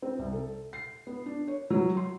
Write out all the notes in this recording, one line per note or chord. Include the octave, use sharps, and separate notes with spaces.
C4
C2
A4
C7
B3
D4
C#5
F#3
C6